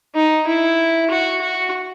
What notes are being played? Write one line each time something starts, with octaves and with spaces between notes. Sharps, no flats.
D#4
E4
F#4
F#4